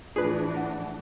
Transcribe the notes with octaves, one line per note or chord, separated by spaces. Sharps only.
A2 E3 D4 F4 G#4 B4
F#5